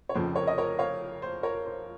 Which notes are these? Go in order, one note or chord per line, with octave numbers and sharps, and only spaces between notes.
C#5
F1 F2 C#3 F3 C5
A#4 C#5
D#5
A#4 C#5
C#5 F5
C5
A#4 C#5
A#4
C5